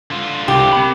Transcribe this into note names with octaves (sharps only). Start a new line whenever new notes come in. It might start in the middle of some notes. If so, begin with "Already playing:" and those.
D3 F4
C2 G4
C4 B5